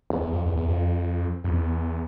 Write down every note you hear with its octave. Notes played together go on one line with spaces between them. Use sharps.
E2
E2
F2
E2
E2
F2
F2
E2